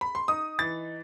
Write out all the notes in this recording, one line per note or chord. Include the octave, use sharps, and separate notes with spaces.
B5
C6
D#4 D#6
E3 A6